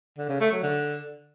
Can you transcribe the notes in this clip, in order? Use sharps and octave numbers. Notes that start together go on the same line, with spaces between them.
D3
C#3
A3
F#3
D3